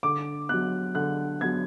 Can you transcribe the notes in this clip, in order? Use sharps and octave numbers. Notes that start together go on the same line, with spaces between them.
D3 D6
F#3 B3 F#6
D3 F#6
F#3 B3 G#6